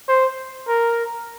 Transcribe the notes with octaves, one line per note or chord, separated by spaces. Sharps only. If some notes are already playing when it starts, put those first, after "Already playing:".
C5
A#4